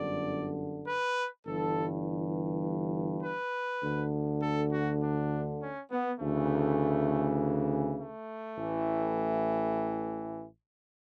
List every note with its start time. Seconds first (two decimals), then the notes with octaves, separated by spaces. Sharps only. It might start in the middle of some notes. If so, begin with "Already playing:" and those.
Already playing: G1 F#2 D3 D5
0.86 B4
1.45 G1 G2 E3 A4
3.23 B4
3.83 D2 D3
4.41 A4
4.71 F#4
5.01 D4
5.60 C#4
5.90 B3
6.20 D2 C#3 E3 A3
7.98 A3
8.57 A1 A2 E3